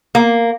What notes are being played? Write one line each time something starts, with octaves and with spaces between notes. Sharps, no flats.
A#3